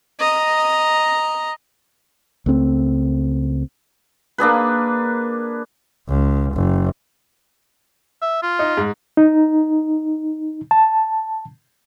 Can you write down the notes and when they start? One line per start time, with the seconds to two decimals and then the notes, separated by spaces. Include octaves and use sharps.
0.19 D#5 A#5
2.46 C#2 A3 C4
4.38 A#3 D4 G#4 B4
6.09 C#2
6.54 F#1
8.22 E5
8.42 F4
8.59 D#4
8.77 G#2
9.17 D#4
10.71 A5